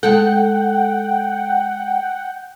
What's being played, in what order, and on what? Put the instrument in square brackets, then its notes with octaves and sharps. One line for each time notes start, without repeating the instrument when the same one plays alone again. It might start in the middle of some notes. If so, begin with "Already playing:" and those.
[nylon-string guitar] G#3 A4 [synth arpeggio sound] F#5 G5